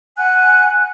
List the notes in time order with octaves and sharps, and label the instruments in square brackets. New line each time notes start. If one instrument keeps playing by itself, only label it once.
[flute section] F#5 G#5 F#6